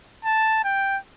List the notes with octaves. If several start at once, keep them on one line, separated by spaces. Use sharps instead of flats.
A5
G5